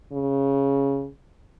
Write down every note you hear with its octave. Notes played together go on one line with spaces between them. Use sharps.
C#3